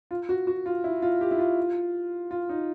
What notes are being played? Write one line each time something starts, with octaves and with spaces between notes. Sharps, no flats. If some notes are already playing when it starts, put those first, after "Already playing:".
F4
F#4
F#4
F4
E4
F4
G4
E4
F4
F4
D#4